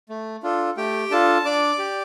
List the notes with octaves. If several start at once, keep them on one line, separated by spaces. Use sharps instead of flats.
A3
D4 F4 A4
A3 G4 G5
D4 F4 A4 A5
D4 D5 D6
G4